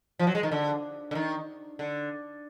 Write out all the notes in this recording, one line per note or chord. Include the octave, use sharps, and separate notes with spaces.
F3
F#3
G#3
D#3
D3
D3
D#3
D3